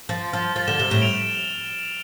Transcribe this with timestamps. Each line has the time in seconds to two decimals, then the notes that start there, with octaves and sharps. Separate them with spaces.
0.09 F3 A6
0.33 F3 F6
0.56 F3 A6
0.67 D3 E7 G7
0.79 C3 E7 G7
0.90 A2 E7 G7
1.02 D7 F7